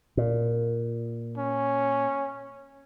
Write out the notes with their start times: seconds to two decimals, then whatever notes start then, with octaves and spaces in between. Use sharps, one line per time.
0.17 A#2
1.37 C#4